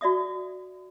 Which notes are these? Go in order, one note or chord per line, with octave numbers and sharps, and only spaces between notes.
F#4 D5 E5 D#6